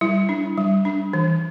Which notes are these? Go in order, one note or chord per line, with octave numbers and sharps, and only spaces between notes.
G3 E4
D4
G3
D4
E3